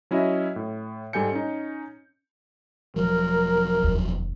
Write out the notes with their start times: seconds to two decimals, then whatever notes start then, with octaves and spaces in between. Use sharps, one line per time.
0.11 F#3 C#4 E4 F#4 D#5 E5
0.56 A2
1.13 G#2 G3 A4 G#5 G6 C#7
1.32 C#4 D#4
2.96 E1 F3 F#3 A#4
3.83 F1 D#2